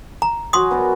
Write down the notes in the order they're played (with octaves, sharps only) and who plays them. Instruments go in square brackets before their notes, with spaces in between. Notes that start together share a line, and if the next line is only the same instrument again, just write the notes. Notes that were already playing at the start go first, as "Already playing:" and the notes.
[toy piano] A#5
[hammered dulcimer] F#3 F#4 G#5 [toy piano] C6 D#6
[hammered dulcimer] B3 A#4 D5